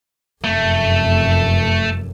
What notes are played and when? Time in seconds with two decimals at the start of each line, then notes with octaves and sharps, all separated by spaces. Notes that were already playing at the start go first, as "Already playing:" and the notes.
0.44 F1 F#2 A3